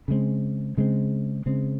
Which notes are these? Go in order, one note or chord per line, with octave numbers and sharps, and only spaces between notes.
C#3 G#3 C4
C#3 G#3 C4
C#3 G#3 C4